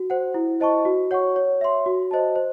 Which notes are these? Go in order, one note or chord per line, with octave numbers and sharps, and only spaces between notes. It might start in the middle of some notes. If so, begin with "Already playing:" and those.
Already playing: F#4
C5 F#5
E4
C5 D#5 A5 C#6
F#4
C#5 F#5 C#6
C#5
E5 C6
F#4
C5 D#5 A5
C5